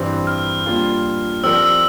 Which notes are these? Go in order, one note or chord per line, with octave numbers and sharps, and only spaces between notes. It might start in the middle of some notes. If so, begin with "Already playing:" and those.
Already playing: G2 E3 G3 C4
F6
G3 A#3 D4 F4
F3 C4 G4 A#4 D5 E6
E6